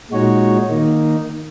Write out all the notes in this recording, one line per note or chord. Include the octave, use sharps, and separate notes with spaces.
A#2 G#3 D#4 F#4 C#5
D#3 A#3 D#4